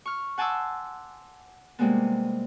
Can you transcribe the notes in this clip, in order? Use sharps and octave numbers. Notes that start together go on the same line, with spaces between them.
C#6 F6
F#5 G#5 A5 C6 D6 E6
C3 G3 G#3 A#3 B3